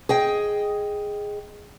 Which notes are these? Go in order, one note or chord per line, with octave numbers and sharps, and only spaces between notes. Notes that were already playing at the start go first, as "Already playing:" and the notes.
G#4 D#5 G5